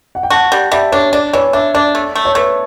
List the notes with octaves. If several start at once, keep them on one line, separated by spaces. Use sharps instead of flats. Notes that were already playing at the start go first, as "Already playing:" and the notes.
F#5
G5
F#4 A5
G3
G3 E5
D4 C#5
D4 D5
E3 C#5
D4 E5
D4 D5
A3
A3
C#5
A3 B4